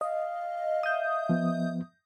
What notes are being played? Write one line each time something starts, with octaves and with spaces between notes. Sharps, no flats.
D#5 F5
D#5 E5 D#6 G6
F3 B3